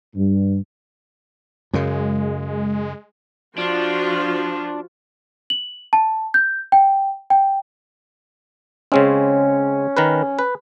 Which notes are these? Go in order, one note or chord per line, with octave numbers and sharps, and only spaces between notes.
G2
F#2 C#3 G#3
F3 D4 F4 F#4
F#7
A5
G6
G5
G5
C#3 G#3 C4 C#4
D#3 A#4 B4
B4